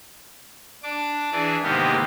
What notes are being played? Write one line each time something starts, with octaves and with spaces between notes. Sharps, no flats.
D4 D6
E3 D4 G#4
G#2 C3 D#3 A#3 B3 G4